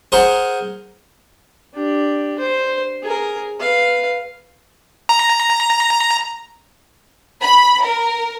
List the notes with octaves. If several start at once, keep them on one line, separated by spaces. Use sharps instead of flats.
G#4 A#4 C5 F#5
D4 G4
C5
G#4 A#4
B4 F5
A#5
B5
A#4